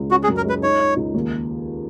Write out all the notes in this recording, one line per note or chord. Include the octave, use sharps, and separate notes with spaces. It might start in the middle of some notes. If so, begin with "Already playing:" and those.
Already playing: C#2
C#4 F#4
G#4
F#2
A#4
G#3 B4
D#4 C#5
D#4
C#2
D#2